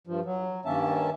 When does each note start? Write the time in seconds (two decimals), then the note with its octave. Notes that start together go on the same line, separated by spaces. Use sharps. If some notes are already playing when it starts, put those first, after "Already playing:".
0.07 G2 F3
0.25 F#3
0.65 G2 D#3 A#3 C#4 E5 A5